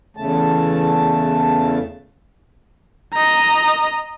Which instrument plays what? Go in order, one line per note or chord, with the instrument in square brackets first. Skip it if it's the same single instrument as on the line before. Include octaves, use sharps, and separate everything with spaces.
[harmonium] E2 C#3 A3 A5
[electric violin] D#5 A#5